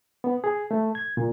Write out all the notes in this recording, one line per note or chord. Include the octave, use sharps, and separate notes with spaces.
B3
G#4
A3
G#6
A#2